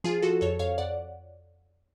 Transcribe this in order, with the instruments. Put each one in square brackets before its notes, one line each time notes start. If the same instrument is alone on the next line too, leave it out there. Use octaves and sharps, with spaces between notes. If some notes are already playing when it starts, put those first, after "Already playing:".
[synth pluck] F3 F4 G#4
F3 F#4 A4
F2 A4 C#5
F2 C#5 F5
F2 D5 F#5